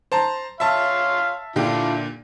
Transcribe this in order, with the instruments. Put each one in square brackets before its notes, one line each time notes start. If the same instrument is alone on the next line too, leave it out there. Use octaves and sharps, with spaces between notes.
[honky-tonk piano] C5 A5 A#5
[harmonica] C#5 F5 C6 [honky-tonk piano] E5 A5
[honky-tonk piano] A#2 D3 G4 [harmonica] D4 E4 F4